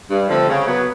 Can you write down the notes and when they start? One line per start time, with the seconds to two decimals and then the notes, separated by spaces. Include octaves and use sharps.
0.09 G2
0.28 D3 F3 A3 C4
0.48 C#3
0.66 F#3 B3